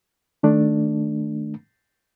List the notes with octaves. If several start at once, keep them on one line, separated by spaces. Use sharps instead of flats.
D#3 A3 D4